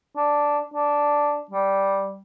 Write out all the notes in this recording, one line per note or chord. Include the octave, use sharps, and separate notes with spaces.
D4
D4
G3